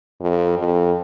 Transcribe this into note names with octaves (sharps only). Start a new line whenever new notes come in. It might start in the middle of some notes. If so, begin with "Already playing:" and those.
F2
F2